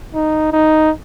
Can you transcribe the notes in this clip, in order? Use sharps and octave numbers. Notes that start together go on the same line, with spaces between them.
D#4
D#4